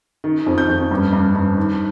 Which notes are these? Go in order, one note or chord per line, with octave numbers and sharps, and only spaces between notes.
D#3
F2
G6
F2
G2
G2
G2
D#3